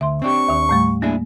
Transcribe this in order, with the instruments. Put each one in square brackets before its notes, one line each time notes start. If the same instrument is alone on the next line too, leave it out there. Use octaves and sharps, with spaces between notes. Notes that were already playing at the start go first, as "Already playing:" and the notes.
[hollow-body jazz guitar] D2 [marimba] E5 C6
[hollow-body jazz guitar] C4 D4 G4 [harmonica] C#6
[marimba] D#2 D#3
A2 G3 A3
[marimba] A#3 [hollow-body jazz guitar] D4 E4 G#4